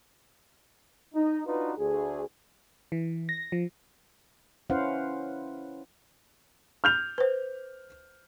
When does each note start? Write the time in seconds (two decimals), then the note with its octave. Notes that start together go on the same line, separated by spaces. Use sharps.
1.15 D#4
1.47 D4 D#4 F4 F#4 B4
1.78 D2 G#4
2.92 E3
3.29 A#6
3.52 F3
4.70 C#4 E4 B4 C5 F5 F#5
6.84 F6 G6 F7
7.18 B4 C5